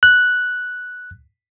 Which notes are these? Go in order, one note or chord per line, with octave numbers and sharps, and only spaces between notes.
F#6